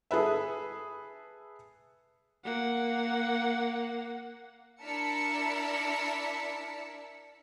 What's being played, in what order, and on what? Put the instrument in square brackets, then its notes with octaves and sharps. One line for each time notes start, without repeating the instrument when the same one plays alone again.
[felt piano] G#4 A4 B4 E5
[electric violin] A#3 F#5
[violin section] D4 E4 A#4 A5 B6 C#7